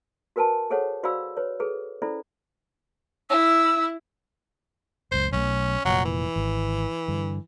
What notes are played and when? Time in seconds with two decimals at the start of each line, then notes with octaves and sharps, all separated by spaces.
0.36 F#4 A#4 B4 G#5 A5 C6
0.70 G#4 A4 C5 C#5 F#5
1.03 F#4 C5 D5 F5 B5 E6
1.37 B4 C#5
1.60 G#4 A4 B4
2.02 C#4 E4 A4 C5 D5 B5
3.30 E4 E6
5.12 F#1 C#2 C5
5.33 B1 A3 C#4
5.85 F1 A#2 F#3
6.05 E3
6.36 G#1
7.08 G2 D3